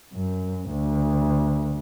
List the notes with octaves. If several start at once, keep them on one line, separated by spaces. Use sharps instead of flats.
F#2
D2